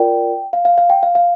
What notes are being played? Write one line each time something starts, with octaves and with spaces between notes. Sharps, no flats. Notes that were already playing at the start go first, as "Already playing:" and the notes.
Already playing: F4 A#4 D5 G5
F5
F5
F5
G5
F5
F5